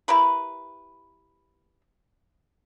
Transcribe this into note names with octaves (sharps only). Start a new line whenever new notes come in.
E4 G4 A#4 B4